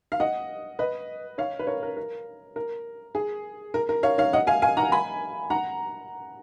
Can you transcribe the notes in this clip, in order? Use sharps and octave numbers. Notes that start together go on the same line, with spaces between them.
F5
D#5 F#5
B4 D#5
C#5 F5
B4
A#4 C#5
A#4
A#4
A#4
G#4
A#4
A#4
C#5 F5
C#5 F5
D#5 F#5
F5 G#5
F5 G#5
F#5 A#5
G#5 B5
F#5 A#5